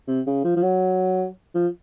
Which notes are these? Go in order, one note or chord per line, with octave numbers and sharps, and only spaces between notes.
C3
C#3
F3
F3
F#3
F3